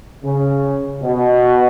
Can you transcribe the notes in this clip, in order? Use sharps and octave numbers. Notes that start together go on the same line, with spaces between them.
C#3
B2